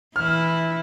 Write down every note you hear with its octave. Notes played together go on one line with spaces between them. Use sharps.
E3 E4 F6